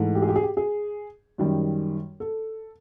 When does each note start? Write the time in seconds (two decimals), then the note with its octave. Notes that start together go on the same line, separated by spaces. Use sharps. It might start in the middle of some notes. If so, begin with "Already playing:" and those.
Already playing: G#2 E3 A3
0.15 G4
0.22 G#4
0.29 G4
0.36 G#4
0.43 G4
0.57 G#4
1.38 F#2 D#3 G3
2.20 A4